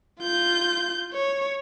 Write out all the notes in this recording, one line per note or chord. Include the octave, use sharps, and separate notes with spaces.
F4 G6
C#5